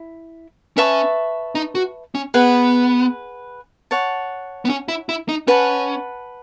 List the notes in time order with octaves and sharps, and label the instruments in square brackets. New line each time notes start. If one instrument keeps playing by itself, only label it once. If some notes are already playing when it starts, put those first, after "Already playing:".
Already playing: [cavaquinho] E4
[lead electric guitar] C#4 [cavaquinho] B4 E5 A5 C#6
[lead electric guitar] D#4
F#4
C#4
[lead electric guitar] B3 [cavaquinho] G#4 B4 F#5
[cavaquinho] C#5 F#5 A5
[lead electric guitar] B3
C#4
E4
E4
D#4
[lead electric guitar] C#4 [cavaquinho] B4 F#5 A5